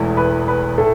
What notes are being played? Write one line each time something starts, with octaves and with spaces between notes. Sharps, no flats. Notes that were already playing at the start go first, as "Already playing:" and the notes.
Already playing: E1 E2 E3 A3
B4
B4
A2 A3 A4